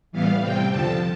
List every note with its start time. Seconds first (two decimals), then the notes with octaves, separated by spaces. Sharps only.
0.12 A2 E3 G3 B3 F5
0.41 C3 G3 C4 G5
0.70 F2 D3 F3 A5